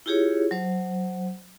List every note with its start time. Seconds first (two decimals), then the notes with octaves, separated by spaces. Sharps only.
0.06 E4 F4 G4 G#4 C#5
0.51 F#3 C5